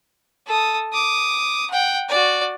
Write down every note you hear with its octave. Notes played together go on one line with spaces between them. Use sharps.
A4 D#6
D6 D#6
F#5 G5
F#4 D5